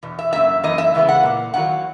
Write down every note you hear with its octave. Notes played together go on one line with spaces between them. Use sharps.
E2 B2
E5
F#2 E3 A#3 E5
F#2 E3 A#3 D#5
E5
E2 C#3 E3 G#3 B3
F#5
A#2 A#3
E2 D#3 F#3 A#3 F#5